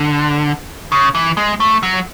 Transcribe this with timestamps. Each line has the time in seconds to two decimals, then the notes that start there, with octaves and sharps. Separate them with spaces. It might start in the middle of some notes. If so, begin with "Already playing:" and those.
Already playing: D3
0.92 C#3
1.15 E3
1.37 G#3
1.60 A3
1.83 F#3